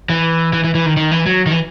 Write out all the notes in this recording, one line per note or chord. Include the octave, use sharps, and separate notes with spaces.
E3
E3
E3
E3
D#3
D#3
E3
F#3
D#3
E3